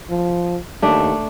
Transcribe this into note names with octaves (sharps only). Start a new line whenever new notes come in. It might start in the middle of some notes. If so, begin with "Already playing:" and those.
F3
D#2 A3 D4